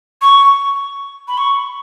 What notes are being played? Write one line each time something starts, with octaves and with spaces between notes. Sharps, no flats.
C#6
B5
C#6